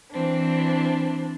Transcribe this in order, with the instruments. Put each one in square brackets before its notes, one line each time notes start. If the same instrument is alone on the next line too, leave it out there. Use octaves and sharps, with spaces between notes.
[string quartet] E3 C4 D4